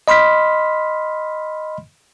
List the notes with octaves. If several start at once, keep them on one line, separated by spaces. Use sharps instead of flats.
D#5 B5 C6 F6 B6